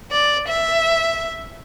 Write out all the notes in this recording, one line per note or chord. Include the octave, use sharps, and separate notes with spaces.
D5
E5